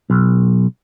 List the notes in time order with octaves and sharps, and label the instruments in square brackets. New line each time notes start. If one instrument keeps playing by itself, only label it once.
[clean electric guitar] B1